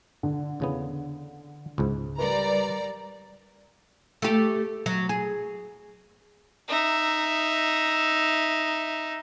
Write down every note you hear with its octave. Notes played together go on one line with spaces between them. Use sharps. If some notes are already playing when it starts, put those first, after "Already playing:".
D3
E2 C#3 B3
C#2 G#2
G3 A#4 B4 D5 A#5
A3 G4
F#3
G#4
D#4 E5